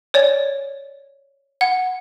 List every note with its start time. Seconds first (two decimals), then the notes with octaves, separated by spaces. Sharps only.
0.14 C#5 D5
1.61 F#5